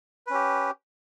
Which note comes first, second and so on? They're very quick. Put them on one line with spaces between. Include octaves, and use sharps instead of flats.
B4 C#4 G4